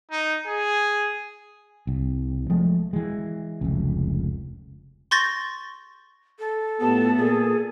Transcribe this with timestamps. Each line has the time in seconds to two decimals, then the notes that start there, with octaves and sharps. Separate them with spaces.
0.11 D#4
0.47 G#4
1.87 C2
2.50 F3 G#3 A3
2.93 E3 G#3
3.61 F1 C#2
5.11 C6 C#6 G6 A6 A#6
6.39 A4
6.81 A2 B3 F4 G4 A5
7.18 A#2 G#4